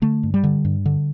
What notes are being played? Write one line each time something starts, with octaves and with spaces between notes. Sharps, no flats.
D3 A3
G2
G3
D3
G2
D3